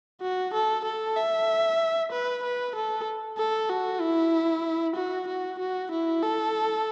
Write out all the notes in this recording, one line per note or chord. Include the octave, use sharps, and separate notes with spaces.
F#4
A4
A4
E5
B4
B4
A4
A4
F#4
E4
F#4
F#4
F#4
E4
A4